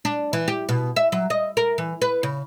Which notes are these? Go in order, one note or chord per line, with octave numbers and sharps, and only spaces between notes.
D4
E3
G4
B2
E5
F#3
D#5
A#4
E3
B4
C#3